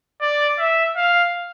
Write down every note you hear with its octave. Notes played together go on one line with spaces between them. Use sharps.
D5
E5
F5